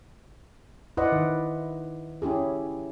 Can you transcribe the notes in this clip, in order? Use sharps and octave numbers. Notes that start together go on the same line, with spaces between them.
E4 B4 C5 D5 D#5 F#5
D#3
C#4 E4 G4 G#4